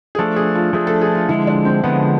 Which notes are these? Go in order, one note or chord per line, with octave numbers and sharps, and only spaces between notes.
G#4
F3 A3 D4 A4
G#4
F4
F3 A3 D4 G#4
A4
G#4
F4
D3 F3 G#3 E4
D4
C4
D3 F3 G#3 B3